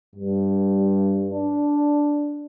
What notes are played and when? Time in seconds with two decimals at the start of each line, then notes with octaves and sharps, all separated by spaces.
0.16 G2
1.31 D4